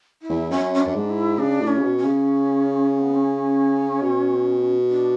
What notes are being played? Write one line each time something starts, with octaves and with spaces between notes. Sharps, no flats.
E4
E2
F#2 C#4
C#4
D4
F#2
G#2
E4
C#3 D4
A2
C#4
C#3
B2
C#4
C#3
B3
C#4
B2
D4